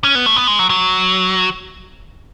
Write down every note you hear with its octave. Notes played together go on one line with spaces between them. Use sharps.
C#4
B3
A3
B3
G#3
F#3
F#3